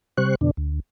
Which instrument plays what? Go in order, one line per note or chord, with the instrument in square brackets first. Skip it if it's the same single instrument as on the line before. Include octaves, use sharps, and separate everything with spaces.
[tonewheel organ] C3 G3 C5 C#6 F#6
F2 B2 D3 D4
D2